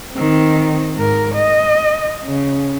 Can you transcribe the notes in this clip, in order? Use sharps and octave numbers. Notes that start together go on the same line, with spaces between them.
D#3 C4
G#2 A#4
D#5
C#3